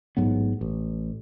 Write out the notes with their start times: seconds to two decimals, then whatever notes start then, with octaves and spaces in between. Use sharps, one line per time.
0.17 A1 G#2 F#3 B3
0.61 A1